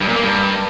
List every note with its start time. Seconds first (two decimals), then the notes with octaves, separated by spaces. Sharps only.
0.01 G2
0.08 A#2
0.16 A#3
0.23 G2